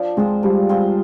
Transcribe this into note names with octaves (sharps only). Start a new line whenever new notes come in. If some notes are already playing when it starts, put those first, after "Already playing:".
Already playing: F3 D4
G#3 C4 F4 G#4
F3 G3
C4 F4 G#4